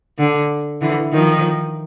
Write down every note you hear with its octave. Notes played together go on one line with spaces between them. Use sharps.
D3
D3 E3
D#3 F3